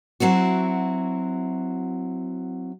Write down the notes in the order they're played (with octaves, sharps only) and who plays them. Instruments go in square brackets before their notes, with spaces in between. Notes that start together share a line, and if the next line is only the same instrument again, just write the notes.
[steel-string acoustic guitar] F#3 C4 E4 F#4